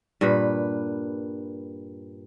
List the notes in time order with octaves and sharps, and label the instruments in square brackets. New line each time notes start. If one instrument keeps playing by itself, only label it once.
[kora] G2 A#2 B4